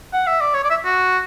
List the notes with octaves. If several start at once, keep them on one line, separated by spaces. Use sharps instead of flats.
F#5
E5
D5
C#5
D5
E5
F#4